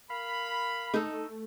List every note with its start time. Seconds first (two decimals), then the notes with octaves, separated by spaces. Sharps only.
0.10 A#4 F5 B5
0.94 A3 D#4 A4